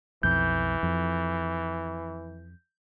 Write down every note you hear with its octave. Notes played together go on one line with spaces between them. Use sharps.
B1 F2 E3 G6
F2